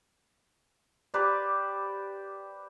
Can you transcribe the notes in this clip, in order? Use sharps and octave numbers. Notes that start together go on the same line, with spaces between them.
G4 B4 C5 D5